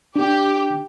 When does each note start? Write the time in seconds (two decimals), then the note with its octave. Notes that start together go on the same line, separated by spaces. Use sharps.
0.16 D4 G4